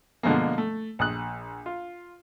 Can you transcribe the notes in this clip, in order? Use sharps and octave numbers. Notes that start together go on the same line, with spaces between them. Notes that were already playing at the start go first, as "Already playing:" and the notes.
B2 D3 F3 G#3 A#3
A3
A#1 D#6 F#6
F4